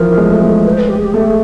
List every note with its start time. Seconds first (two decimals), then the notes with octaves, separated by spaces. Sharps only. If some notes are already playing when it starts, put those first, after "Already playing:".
Already playing: E3 F3 A#4
0.18 G#3
0.30 A3
0.43 G#3
0.65 B4
0.73 C5
0.79 B4
0.89 G4
0.97 G#4
1.05 G4
1.12 A3 G#4
1.20 G4
1.27 G#4